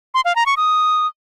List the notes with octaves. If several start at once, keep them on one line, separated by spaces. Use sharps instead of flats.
C6
F5
A#5
C#6
D#6